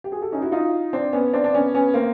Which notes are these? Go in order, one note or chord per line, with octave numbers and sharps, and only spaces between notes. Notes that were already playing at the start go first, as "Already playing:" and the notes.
G4
F#4 G#4
G4 A4
C#4 D#4
E4 F#4
D#4 F4
C4 D4
B3 C#4
C4 D4
D4
B3 C#4
B3 C#4
A#3 C4